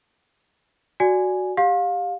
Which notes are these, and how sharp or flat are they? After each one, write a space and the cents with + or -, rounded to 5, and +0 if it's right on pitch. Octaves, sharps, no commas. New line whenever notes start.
F#4 +0 D5 +0 G#5 +0
G4 +10 F5 +25